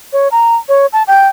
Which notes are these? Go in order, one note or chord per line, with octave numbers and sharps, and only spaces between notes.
C#5
A#5
C#5
A5
G5